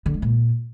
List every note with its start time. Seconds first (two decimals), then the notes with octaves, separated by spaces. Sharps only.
0.06 D3
0.14 G#3
0.22 A#2